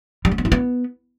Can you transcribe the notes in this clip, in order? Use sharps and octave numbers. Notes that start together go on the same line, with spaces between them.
G3
C#4
B3
E4
B3